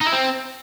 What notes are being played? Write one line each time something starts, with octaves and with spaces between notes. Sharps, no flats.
D#4
E4
C4